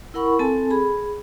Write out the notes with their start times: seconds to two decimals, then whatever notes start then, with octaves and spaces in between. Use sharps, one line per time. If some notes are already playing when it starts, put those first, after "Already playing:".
0.14 E4 A#4 F#5 B5 C#6
0.39 C4 A4 G#5 A5
0.70 G#4 B5